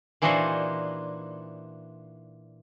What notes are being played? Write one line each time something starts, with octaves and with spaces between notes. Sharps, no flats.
A#2 E3 D4 D#4 F#4 C5